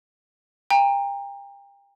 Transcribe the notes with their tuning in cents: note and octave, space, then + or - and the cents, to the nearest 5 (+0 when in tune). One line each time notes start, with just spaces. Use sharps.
G5 +35 A#5 +0